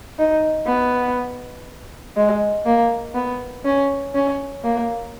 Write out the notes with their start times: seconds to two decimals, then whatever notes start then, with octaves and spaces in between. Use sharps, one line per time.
0.19 D#4
0.67 B3
2.17 G#3
2.66 A#3
3.15 B3
3.65 C#4
4.15 C#4
4.64 A#3